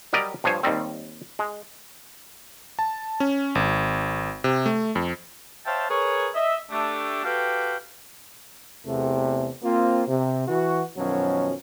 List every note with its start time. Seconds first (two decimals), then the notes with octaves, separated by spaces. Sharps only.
0.13 F#3 G3 G4 A#4 D5 D#5
0.44 G2 F3 C5 C#5 G#5
0.63 D#2 D#3 G3 C4
1.39 G#3
2.79 A5
3.20 C#4
3.55 G#1
4.44 C3
4.66 A3
4.95 F2
5.66 C5 C#5 E5 F5 G5 A5
5.89 G#4 A#4 B4 C#5
6.34 D#5 E5
6.70 A3 D4 G4
7.24 F#4 G4 A4 B4 F5 G5
8.86 E2 C3 A3
9.62 A#3 C4 F4
10.07 C3
10.48 E3 F#4
10.97 F#2 B2 D#3 F3 F#3 C#4